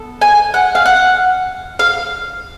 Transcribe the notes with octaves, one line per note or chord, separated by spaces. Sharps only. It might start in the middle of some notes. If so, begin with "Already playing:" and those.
Already playing: B3 A4
G#5
F#5
F5
F#5
F5